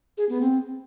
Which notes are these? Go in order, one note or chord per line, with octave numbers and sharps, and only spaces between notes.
G#4
B3
C4